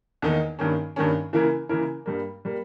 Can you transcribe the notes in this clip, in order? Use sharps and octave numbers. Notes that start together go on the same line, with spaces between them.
E2 D#3 A#3 D#4
G2 D#3 A#3 C#4
G2 D#3 A#3 C#4
C#3 E3 A#3 E4 A#4
C#3 E3 A#3 E4 A#4
G2 G3 A#3
G3 A#3